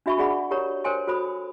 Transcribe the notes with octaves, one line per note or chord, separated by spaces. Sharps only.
D4 F#4 E5 B5 C#6
D4 G#4 D5 F#5 B5
G4 A#4 C#5 A#5 B5
A#4 C5 C#5 G5 G#5 C6
F#4 A4 C5 B5 D#6